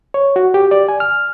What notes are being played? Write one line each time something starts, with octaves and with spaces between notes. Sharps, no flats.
C#5
F#4
G4
D5
G#5
F6